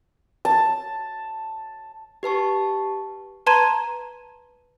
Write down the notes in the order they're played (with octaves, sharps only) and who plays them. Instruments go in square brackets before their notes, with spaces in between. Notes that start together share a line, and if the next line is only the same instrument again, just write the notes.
[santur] A5
[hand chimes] G4 B4 A5 C#6
[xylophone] B4 A5 A#5 C6 G#6 D#7